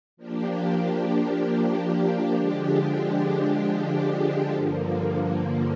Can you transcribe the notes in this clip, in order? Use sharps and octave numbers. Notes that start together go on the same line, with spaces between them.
F3 A#3 D4 G4
D3 F3 G#3 D4 G4
G2 D3 F3 A#3